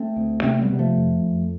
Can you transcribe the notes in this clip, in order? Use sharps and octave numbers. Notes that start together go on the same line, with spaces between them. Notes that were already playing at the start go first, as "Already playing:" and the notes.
Already playing: A3 C4
D2
C3 A3 C4
G3 B3
C3
F3 A3
F2
F2